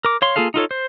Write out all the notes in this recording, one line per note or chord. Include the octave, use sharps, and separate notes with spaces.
A#4 D6
C#5 F5 C6
A#3 F4 G#4 A4 F5
D#4 F4 A4 C#5
C5